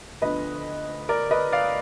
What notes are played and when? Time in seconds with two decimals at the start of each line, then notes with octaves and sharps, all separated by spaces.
0.22 D2 D3 F3 B3 D4 B4 D#5
1.09 A#4 D5
1.31 B4 D#5
1.52 D5 F5